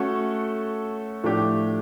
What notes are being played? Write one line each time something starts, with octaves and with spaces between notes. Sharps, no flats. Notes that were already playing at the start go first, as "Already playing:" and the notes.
Already playing: A3 C#4 F#4 A4
A2 F3 A3 D4 G4